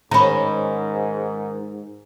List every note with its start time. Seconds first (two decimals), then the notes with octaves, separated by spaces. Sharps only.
0.11 G#2 D#3 C#4 A#5 B5